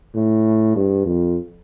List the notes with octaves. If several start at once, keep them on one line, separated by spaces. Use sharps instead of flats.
A2
G2
F2